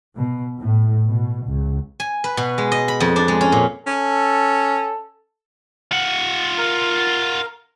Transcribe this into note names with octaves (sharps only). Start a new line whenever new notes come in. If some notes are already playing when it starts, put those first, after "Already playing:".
B2
A2
B2
C#2
G#5
B4
B2
G#3
D#5
B5
F2
D4
G#3
C#4
A#2
C#4 A4
F4 F#5
A#4